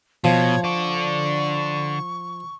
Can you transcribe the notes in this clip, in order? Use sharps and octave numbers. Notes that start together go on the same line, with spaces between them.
B2 F3 C#5
D3 D5 C#6